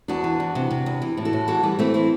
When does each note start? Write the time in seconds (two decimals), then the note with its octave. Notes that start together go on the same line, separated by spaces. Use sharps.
0.08 E2 D4 F#4
0.24 E3
0.40 E2
0.55 C3
0.71 C3
0.86 E2
1.02 E3
1.17 A2
1.25 F#4 A4
1.33 A2
1.48 E3 F#4 A4
1.63 E3 G3 B3
1.79 E3 A3 C4
1.94 C4 E4